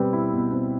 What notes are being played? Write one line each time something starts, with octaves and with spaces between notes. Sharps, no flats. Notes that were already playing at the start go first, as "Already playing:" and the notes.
Already playing: B2 G3 C4 B4
E4
B2
C4